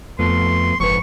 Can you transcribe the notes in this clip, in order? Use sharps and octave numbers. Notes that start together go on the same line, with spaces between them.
F2 F3 A3 B3 C6
F#1 F2 G#2 B4 C#6